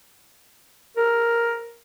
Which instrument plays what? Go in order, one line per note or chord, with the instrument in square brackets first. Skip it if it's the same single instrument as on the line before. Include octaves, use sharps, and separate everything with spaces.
[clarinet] A#4